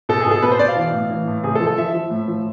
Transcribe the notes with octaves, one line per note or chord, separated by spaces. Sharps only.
B2 A4
G#4
B2 A4
B2 B4
C5
B2 D5
F5
E3
A2
E3
A2
C3 G#4
A4
F3
A4
F3 E5
F3
A2
F3